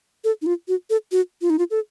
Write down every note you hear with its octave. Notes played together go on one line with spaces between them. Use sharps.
A4
D#4
F4
F#4
A4
F#4
F4
D#4
F4
A4